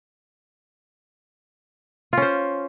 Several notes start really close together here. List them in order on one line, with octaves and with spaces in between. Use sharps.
F4 C#4 C5